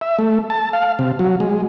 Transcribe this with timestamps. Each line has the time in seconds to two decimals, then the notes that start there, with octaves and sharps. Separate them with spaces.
0.01 E5
0.19 A3
0.50 A5
0.73 F5
0.99 C3
1.19 F#3
1.40 G#3